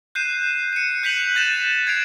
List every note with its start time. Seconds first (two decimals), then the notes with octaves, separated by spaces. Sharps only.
0.15 F#6 G6 C7 D#7 E7
0.73 C#7 D#7
1.03 F#6 G6 B6 D#7 F7 F#7
1.35 F#6 G6 A6 A#6 D#7 E7
1.87 G#6 C7 D7 F7